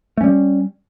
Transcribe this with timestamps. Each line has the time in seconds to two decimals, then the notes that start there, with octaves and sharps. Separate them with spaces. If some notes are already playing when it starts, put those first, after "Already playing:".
0.17 A3
0.21 C#4
0.24 G3